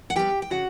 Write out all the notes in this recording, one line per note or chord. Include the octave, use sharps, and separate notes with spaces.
F#5
G3 B3 G4 G5
G5
C#3 F#4 F#5